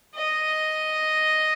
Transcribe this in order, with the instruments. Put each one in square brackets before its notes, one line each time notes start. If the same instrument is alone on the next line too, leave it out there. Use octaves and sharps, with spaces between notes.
[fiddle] D#5